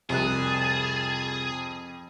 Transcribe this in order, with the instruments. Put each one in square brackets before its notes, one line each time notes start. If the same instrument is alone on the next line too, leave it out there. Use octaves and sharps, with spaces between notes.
[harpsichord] C2 C3 [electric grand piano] F2 F#6 [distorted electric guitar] G#4 [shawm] A5